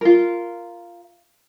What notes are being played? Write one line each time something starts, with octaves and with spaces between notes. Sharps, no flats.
F4 A#4